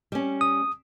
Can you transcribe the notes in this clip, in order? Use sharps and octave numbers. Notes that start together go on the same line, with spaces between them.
G3 C#4
D#6